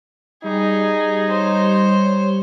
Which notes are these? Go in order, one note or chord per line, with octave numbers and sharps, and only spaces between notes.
G3 D#4 G#4
C5 C#5